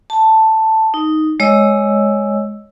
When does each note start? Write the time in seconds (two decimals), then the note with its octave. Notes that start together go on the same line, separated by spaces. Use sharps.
0.10 A5
0.94 D#4
1.40 G#3 C#5 D#5 E6